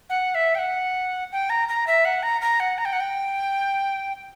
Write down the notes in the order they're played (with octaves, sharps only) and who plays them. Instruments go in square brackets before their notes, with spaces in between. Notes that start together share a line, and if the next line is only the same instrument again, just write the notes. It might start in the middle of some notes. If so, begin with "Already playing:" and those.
[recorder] F#5
E5
G5
F#5
G5
A#5
A#5
E5
F#5
A#5
A#5
F#5
A#5
G5
F#5
G5